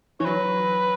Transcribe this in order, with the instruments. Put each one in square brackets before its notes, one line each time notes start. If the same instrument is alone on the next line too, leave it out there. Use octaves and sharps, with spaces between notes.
[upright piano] E3 [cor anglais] C#5
[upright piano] F#3 [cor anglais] B4